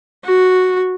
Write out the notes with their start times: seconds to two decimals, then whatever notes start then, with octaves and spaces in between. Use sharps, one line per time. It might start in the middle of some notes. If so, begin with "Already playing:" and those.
0.25 F#4